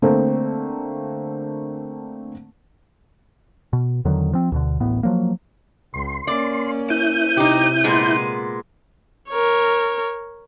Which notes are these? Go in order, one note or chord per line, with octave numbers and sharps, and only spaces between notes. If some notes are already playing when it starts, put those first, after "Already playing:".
D3 A3 A#3 C4
B2
E2 D3 D#3 F#3
F3 C4
D2 B2 D3
D1 A1 A2 B3
F3 F#3 A#3
C#2 C6
A#3 C#4 D5
E4 G6 D#7
C3 D#4 G4
A#2 G#3 B3
A#4 C#5